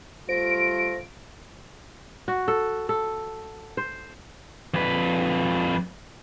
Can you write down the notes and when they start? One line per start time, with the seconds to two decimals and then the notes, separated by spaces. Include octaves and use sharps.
0.29 G3 A3 F4 C5 A#6 D7
2.28 F#4
2.48 A4
2.89 A4
3.77 C5
4.74 F2 B4